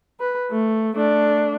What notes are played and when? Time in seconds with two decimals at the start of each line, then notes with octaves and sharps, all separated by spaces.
0.20 B4
0.51 A3
0.96 A3 D4